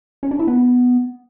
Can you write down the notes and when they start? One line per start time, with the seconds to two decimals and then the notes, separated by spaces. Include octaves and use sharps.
0.23 C#4
0.31 D4
0.39 E4
0.48 B3